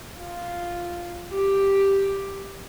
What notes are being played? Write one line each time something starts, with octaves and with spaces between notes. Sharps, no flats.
F4
G4